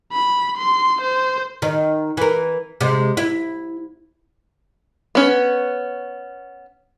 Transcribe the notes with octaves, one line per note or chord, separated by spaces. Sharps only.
B5
C6
C5
D#3
E3 A#4
C3 G#3
E4
B3 C#4